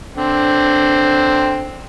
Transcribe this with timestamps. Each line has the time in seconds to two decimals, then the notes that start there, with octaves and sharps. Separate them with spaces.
0.17 D3 C4